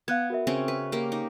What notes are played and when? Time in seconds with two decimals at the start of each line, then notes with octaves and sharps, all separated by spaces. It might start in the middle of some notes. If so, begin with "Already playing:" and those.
0.08 B3 F5 F#6 G#6
0.30 F#4 A#4 E5
0.47 C#3 C4 C#4
0.68 B4
0.92 A#3 G4
1.12 D#4